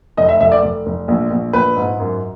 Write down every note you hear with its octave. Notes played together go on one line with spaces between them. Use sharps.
F1 D#5
E5
F1 E5
D5
F1
F1
A#1
A#1
A#1 B4
G#2
F#2